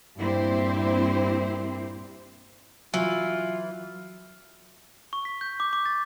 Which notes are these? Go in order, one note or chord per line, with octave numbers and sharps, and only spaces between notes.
G2 A#2 C4 E4 G4 C5
E3 F#3 F4
C#6
B6
G6
D6
D6
A6